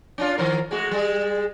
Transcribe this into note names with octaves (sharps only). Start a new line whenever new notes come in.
C#4 D4 F4
D#3 F3 A#4
G#3 A3 F#4
G3 G#3